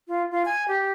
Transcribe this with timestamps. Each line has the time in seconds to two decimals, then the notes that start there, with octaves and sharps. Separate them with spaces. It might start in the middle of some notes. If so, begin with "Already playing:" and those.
0.08 F4
0.31 F4
0.45 G#5
0.68 G4